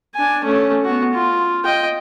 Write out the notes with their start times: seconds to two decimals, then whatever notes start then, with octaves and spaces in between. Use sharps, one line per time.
0.14 D4 G#5
0.44 A3 C#4
0.85 B3 F#4
1.14 F4
1.65 D#5 G5